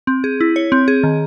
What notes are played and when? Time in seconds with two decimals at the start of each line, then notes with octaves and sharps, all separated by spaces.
0.07 C4
0.24 G#4
0.40 E4
0.56 C#5
0.72 C4
0.88 G#4
1.03 D#3